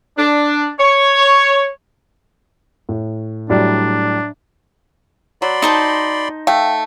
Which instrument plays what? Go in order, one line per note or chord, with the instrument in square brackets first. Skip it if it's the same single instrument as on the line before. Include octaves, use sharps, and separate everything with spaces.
[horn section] D4
C#5
[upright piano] A2
[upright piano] A2 F#3 G3 [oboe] D4
[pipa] F#3 [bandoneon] D5 B5 C6
[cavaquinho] D#4 C5 A5
[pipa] A3 [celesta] F5 G5